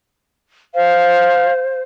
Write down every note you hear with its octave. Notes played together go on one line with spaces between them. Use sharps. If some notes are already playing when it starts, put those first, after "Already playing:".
C5 F5